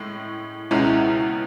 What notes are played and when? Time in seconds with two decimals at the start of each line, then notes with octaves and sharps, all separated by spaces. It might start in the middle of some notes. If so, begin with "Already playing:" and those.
Already playing: A2 G#3
0.71 C#2 B2 G#3 C#4 E4